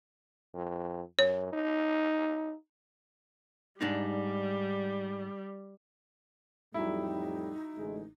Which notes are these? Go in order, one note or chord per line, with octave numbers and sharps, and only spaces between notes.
F2
F#2 C#5
D#4
G#2 G3 D4 D#4
F2 A2 F#3 G3 D#4 E4
A1 D3 G#3